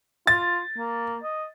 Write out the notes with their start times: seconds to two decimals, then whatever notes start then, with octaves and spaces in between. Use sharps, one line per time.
0.27 F4 A6
0.78 A#3
1.23 D#5